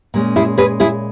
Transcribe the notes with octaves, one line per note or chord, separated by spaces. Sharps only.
A#2 G#3 C#4
E4 G#4
G#4 B4
E4 G#4